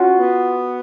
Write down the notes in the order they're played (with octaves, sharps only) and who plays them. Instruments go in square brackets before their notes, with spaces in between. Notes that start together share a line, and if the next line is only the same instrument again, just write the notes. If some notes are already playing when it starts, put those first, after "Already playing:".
Already playing: [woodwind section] C#4 F4 [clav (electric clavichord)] F#4
[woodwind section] B3